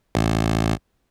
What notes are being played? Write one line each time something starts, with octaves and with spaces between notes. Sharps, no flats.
A1